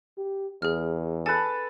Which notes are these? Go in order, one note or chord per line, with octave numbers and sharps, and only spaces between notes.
G4
E2 G#4 F6
A4 B4 G#5 A5